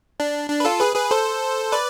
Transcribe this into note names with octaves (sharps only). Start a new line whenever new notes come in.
D4
D4
B4
F4 A4
G#4 B4
G#4 B4
A4 C5
B4 D5